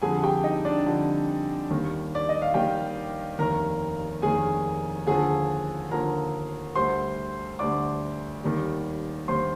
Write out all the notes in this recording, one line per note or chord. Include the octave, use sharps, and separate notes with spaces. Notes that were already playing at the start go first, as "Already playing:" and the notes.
F2 D3 G3 G#4 G#5
G4 G5
D#4 D#5
D4 D5
F2 D3 G3
D#2 D#3 G3
D5
D#5
F5
D#2 D#3 G3 G4 G5
F1 D#2 D#3 A#4 A#5
F1 D#2 D#3 G#4 G#5
D#2 D3 F3 G#4 G#5
D#2 D3 F3 A#4 A#5
D2 D3 G3 C5 C6
D2 D3 G3 D5 D6
D#2 D#3 G3
D#2 D#3 G3 C5 C6